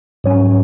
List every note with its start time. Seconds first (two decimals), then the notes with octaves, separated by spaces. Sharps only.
0.24 G#2 F#3 C#4